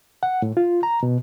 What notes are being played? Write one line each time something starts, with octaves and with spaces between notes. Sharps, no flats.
F#5
A2
F4
A#5
B2